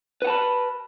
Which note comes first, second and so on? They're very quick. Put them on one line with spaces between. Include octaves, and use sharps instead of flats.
B4 F#5 A5 B5